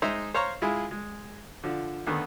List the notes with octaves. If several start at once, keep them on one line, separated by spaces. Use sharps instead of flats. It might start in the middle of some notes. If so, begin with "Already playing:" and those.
G#3 D#4 C5 E5
C5 C#5 F5 A#5 C6 C#6
G#3 E4 F4 G#4
G#3
D3 F3
D#2 D3 D#3 B3